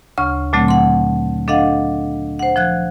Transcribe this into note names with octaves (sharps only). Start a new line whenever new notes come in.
D2 C#3 C#6 F6
A#2 D3 F#3 A3 C4
F#5 C6
D4 A4 D#5 F5 F#5
C5 F#5
F3 F#6 G#6